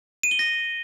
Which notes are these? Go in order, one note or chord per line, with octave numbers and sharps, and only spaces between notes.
D#7
G7
A#6